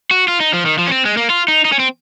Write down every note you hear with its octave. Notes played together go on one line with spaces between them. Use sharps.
F#4
F4
D#4
F3
D#3
F3
C#4
C4
G#3
A#3
F4
D#4
D#4
C#4
C4